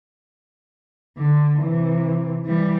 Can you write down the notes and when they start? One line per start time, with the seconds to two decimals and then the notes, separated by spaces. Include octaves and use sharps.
1.17 D3
1.63 C3 E3
2.45 E3 G3